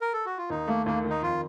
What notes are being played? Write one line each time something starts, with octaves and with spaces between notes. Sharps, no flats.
A#4
A4
F#4
F4
D#2 D#4
A3 A#3
D#2 A#3
D#3
D#4
F2 F4